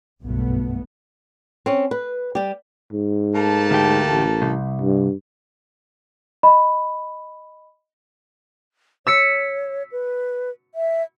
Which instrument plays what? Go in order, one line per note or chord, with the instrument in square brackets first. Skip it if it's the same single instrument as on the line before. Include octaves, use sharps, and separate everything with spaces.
[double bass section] F#1 B1 G2 B2 A3 B3
[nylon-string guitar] C4 C#4
B4
G3 G4
[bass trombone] G#2
[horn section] A3 A#3 A5
[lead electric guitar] D2 G4
[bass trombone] A1
[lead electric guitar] C2
[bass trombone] G2
[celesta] D#5 B5
[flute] C#5 [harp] E6 B6 C#7
[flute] B4
E5